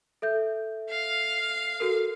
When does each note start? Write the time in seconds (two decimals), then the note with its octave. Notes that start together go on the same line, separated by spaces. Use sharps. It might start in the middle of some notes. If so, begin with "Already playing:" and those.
0.22 A4 E5 G6
0.90 F5
1.80 F#4 A4 A#4